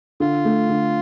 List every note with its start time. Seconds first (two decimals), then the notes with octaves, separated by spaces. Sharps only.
0.20 D3 F4
0.45 A3
0.69 D3